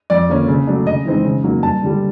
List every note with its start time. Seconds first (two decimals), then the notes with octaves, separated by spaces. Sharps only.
0.10 F2 D5
0.29 D3 F3 A#3 C#4
0.48 C#3
0.67 F#3 A3 D4
0.86 C#3 D#5
1.05 E3 G#3 C4 D#4
1.25 C#3
1.44 F#3 A#3 D#4
1.63 G2 A5
1.82 D3 G3